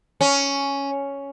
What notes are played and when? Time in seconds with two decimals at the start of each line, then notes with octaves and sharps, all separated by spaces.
0.21 C#4